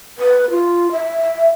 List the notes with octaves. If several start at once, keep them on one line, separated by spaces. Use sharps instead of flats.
B4
F4
E5